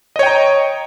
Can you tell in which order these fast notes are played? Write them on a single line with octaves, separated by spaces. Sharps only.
D#5 C#5 G5 A#5